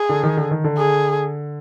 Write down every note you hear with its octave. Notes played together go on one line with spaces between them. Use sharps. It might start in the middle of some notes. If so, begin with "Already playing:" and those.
Already playing: G#4
D3
D#3
D3
D#3
D3
G#4